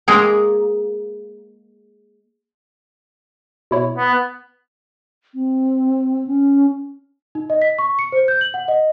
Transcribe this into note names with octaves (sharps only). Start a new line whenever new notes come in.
G#3 A#3 G#4 A#4
B2 E4 C#5
B3
C4
C#4
D#4
D#5
B6
C#6
C#7
C5
G6
F#7
F#5
D#5